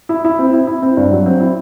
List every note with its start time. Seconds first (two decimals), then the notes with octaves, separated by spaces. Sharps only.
0.09 E4
0.25 E4
0.39 C4
0.53 E4
0.67 E4
0.82 C4
0.97 G2
1.11 F#3
1.26 C4
1.40 E4